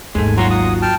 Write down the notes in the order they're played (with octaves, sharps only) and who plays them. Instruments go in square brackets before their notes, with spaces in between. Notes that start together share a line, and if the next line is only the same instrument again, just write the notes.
[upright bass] G#1 D#2 [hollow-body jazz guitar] G#3 A3 [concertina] G#5
[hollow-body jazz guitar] F#3 F4 F#4 [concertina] F#5 A#5 C6
[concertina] F#5 D#6
G5 A5 F6